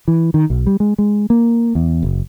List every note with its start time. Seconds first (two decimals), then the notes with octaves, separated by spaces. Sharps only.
0.08 E3
0.34 D#3
0.50 B1
0.67 G3
0.80 G#3
0.98 G#3
1.30 A#3
1.75 E2
2.03 F#1